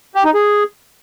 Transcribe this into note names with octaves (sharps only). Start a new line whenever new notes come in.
G4
D#4
G#4